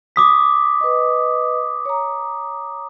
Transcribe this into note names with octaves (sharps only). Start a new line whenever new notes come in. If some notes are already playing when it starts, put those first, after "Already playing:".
D6 D#6 B6
B4 D#5
C#5 A#5